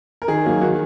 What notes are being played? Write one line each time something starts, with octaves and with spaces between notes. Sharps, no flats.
A#4
D#3 G#4
F#3 A#3
D#3 F#4